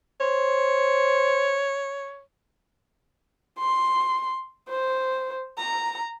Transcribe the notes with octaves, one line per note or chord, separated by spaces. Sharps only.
C5 C#5
C6
C5
A#5